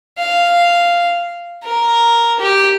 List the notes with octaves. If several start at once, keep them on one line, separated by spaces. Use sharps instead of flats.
F5
A#4
G4